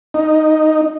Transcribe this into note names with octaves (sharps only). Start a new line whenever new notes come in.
D#4